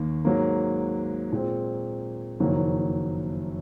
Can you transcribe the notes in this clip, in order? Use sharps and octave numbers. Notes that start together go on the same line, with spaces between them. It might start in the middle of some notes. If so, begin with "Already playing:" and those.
Already playing: D#2 D#3 A#3
G#2 F#3 A#3
A#2 G#3 C4
F#1 F2 D#3 F#3 A#3